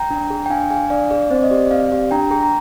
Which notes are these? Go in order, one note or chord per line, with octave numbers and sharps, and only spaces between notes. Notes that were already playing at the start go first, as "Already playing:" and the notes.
Already playing: G5 A#5
D4
G#4
G5
D4 F5 G#5
G#4 F5 G#5
D4 D5 F5
G#4 D5
C4 C5
D#5
G4 D5
C4 D5 F5
G4
D4 G5 A#5
G#4 G5 A#5
A#5